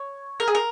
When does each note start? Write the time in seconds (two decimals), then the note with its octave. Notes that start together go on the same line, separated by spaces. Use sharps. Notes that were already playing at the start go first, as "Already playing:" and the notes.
Already playing: C#5
0.40 A#4
0.48 G#4
0.55 A#4